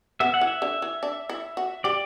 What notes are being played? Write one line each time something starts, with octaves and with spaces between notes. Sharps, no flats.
B3 E5
F#5
E3
E5
D3
E3
D4
E4
F#4
G4 D5